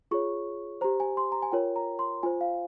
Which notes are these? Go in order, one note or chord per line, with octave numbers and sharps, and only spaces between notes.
F4 G#4 C#5 C#6
G4 C5 A#5
G#5
C6
A#5
G#5
F4 A#4 C#5 G5
A#5
C6
F4 C5 G#5
F5